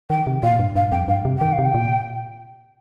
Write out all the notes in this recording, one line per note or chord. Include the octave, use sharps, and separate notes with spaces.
D#3 G5
C3
A#2 F5
G2
G2 F5
F2 G5
G2 F5
C3
D#3 G5
F5
C3
G5
A#2